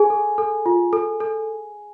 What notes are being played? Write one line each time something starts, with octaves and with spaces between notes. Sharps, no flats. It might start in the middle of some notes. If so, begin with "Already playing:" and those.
Already playing: G#4 G#5
A4
A4
F4
A4
A4